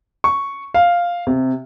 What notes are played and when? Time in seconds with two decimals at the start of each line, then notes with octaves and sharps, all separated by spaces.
0.24 C#6
0.74 F5
1.27 C3